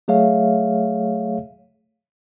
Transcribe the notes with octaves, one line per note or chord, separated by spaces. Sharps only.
F#3 A3 G#4 C#5 E5 F5